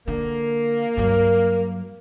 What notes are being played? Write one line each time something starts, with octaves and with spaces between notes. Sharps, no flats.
D3 A#3
G2 F#3 A#4